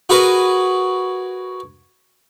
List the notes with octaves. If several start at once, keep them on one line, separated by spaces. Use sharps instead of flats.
F#4 G#4 A#4 B4 G#5